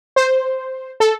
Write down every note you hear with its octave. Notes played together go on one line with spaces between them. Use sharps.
C5
A4